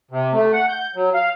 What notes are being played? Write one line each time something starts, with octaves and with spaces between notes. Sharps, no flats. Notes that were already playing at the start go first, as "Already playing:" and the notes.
C3
A3
F#5
G6
F#3
F5